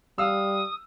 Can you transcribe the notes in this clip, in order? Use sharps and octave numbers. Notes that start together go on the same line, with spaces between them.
G3 F5 D#6 E6